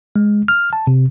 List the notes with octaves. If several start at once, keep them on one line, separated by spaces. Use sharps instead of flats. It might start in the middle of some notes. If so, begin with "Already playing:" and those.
G#3
F6
A5
C3